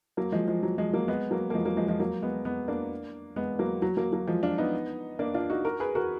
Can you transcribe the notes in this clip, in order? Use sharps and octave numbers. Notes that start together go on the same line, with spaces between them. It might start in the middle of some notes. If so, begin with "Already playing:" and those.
F#3 A#3
F3 G#3
F3 G#3
F#3
F3 G#3
F#3 A#3
G#3 B3
F#3 A#3
A#3
F3 G#3
F#3 A#3
F3 G#3
F3 G#3
F#3 A#3
G#3 B3
G#3 B3
A#3 D4
G#3 B3
F#3 A#3
F#3
F#3 A#3
F#3 A#3
F3 G#3
D4 F4
B3 D#4
A#3 D4
D4 F4
D#4 F#4
F#4 A#4
G#4 B4
F#4 A#4